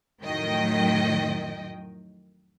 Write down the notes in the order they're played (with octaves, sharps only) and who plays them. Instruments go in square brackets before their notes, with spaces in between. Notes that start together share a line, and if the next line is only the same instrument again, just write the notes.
[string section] F2 A2 D#3 F#3 D#5 G5